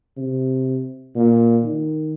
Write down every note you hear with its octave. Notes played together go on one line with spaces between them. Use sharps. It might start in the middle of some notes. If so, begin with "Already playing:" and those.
C3
A#2
D#3